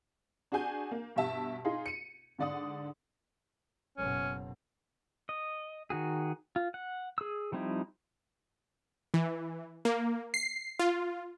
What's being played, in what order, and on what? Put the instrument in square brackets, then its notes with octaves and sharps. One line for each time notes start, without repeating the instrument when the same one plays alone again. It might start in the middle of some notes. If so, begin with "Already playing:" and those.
[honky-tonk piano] D4 F#4 G#4 G#5 G6
A#3
G2 B2 G4 E5 A5
D#4 F4 G#4 C6
C#7 D#7
G#2 D3 D5 F#5 D#6
[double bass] F#1 B2 [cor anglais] C#4
[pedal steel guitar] D#5
D#3 F#4 G#4
F4
F#5
G#4 E6
F3 G3 C4 D#4 E4
[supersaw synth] E3
A#3
C7
F4